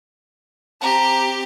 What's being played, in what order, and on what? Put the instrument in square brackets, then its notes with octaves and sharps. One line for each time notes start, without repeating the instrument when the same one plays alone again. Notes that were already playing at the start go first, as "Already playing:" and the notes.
[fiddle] C4 G4 [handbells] A5 A#5